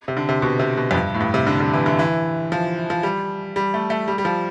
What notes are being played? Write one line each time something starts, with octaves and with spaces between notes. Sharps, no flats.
C3
D3
C3
B2
C3
B2
F2
G2
A2
G2
C3
D3
D3
E3
D3
E3
F3
F3
G3
G3
A3
A3
G3
G3
F3